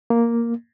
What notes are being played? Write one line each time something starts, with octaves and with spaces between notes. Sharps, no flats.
A#3